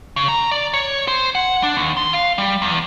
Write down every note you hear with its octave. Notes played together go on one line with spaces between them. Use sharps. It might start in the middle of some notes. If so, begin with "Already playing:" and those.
C#3
A#5
D5
C#5
C5
F#5
D4
D#2
C6
F5
G3
E2